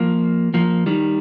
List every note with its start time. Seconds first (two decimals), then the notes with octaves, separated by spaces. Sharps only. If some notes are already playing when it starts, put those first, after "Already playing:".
Already playing: F3 A#3
0.54 F3 A#3
0.86 D#3 G3